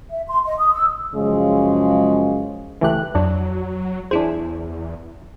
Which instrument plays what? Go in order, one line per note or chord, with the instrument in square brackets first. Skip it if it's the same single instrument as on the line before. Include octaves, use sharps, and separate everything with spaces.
[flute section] E5
C6
D#5
D#6
E6
[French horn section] F#2 C#3 F3 G#3
[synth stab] C#2 F#6 [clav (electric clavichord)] E3 A3 G4
[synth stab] F2 [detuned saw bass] F#3 [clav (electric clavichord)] D4
[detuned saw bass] E2 [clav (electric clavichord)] D4 C5 [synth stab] E4 G#4